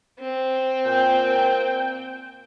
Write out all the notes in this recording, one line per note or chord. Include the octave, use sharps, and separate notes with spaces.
C4
A#2 G5